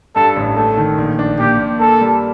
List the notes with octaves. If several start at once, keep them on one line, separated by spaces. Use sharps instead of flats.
G2 A4
A1
A3 A4
D#3
A#1
D4
A#2 G4
A#2
A#3 A4
G3